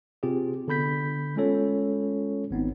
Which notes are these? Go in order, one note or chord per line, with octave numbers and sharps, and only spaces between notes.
C3 C4 F4 G4 G#4
D3 B3 B5 G6 B6
G#3 A3 C#4 F4 A4 C#5
G#1 B3 C4 D#4